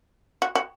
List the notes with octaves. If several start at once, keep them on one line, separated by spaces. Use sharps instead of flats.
F#4
F#4